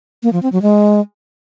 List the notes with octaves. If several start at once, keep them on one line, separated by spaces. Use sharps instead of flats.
A#3
F3
C4
F#3
G#3